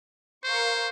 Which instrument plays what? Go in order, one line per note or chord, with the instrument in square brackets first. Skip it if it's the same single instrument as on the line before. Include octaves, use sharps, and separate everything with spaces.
[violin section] A#4 F5 C#6 [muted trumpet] C5